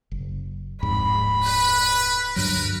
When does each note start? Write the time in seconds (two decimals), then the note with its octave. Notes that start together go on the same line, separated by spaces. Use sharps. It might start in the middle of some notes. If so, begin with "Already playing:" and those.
0.11 F#1
0.83 D1 F2 G#2 B5
1.43 B4
2.36 D2 G2 F#3 A#4 B4